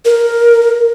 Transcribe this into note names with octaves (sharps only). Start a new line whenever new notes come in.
A#4